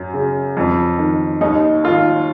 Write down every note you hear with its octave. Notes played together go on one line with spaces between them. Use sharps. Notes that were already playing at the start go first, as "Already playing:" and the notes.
Already playing: F#2
C#3
F2
D#3
D#2 D#4
D#3 F4